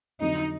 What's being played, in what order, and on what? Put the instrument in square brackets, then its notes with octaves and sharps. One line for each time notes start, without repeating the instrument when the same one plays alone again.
[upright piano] F2 D3 F#3 [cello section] D#4